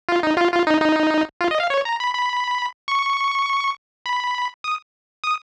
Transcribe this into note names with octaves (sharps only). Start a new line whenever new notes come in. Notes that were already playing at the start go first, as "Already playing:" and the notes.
F4
D#4
F4
F4
D#4
D#4
F4
D#5
F5
C#5
A#5
B5
B5
C#6
B5
D#6
D#6